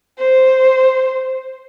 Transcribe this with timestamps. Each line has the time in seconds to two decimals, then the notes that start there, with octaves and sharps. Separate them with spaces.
0.19 C5